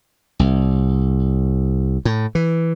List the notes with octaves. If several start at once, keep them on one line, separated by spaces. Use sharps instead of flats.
C2
A2
E3